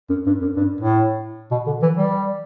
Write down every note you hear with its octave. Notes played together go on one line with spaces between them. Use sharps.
F#2
G2
F#2
G2
A2
B2
D3
E3
G3